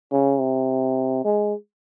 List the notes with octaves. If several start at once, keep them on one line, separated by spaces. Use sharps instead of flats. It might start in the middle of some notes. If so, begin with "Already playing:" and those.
C#3
C3
G#3